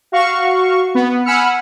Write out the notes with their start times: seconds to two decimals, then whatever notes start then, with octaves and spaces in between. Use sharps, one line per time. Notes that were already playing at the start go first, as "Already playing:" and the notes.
0.12 F#4 F5 C#6
0.95 B3
1.25 F#5 G#5 B5 E6 F6 C#7